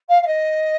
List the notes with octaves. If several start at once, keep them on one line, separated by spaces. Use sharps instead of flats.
F5
F5
D#5